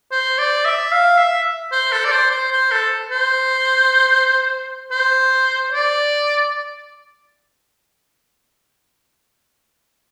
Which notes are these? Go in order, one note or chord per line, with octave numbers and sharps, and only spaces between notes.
C5
D5
E5
F5
E5
C5
A4
D5
C5
C5
C5
A4
C5
C5
D5